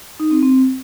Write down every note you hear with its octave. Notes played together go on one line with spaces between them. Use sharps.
D#4
C4
C4